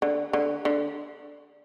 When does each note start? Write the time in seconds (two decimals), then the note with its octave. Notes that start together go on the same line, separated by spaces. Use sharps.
0.02 D3
0.33 D3
0.65 D3